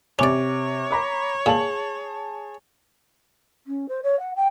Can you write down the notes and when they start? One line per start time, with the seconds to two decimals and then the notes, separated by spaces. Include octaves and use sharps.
0.19 C3 C#4 C#5 D5 D6
0.91 A#5 B5 D6
1.46 A#2 G#4 A5 F#7
3.66 C#4
3.88 C5
4.03 C#5
4.19 F#5
4.35 G5